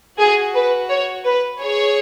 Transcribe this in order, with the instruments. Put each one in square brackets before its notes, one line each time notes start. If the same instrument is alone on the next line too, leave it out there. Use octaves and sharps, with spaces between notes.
[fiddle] F#4 [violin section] G#4
[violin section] B4
C#5
B4
[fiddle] G#4 [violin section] C#5